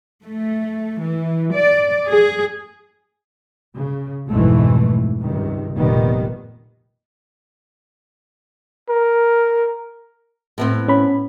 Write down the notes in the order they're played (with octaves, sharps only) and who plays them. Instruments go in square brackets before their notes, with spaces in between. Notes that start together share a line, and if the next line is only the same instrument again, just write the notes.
[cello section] A3
E3
D5
G#4
[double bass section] C#3
B1 F2 G#2 B2 E3 A3
C#2 G2 C3 D#3
F1 A#2 D#3 G3 B3
[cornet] A#4
[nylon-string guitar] A2 B3 C4
[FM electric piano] C#4 B5